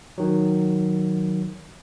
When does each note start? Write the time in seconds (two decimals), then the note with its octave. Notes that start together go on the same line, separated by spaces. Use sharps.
0.18 D#3 F#3